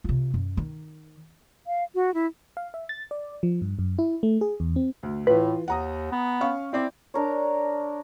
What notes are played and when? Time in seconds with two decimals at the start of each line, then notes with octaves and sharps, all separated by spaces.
0.04 C3 F4
0.34 F#2
0.57 D#3
1.67 F5
1.95 F#4
2.14 E4
2.57 F5
2.74 E5
2.89 A6
3.11 D5
3.43 F3
3.62 G2
3.79 F#2
3.99 E4
4.23 A3
4.41 G#4
4.60 E2
4.76 C4
5.03 D2
5.27 A2 E3 F4 B4
5.68 D#2 F#5 A#5 D#6
6.12 B3
6.41 C#4 F5 C#6
6.73 C4 E4 D5 D6
7.14 D4 A#4 C#5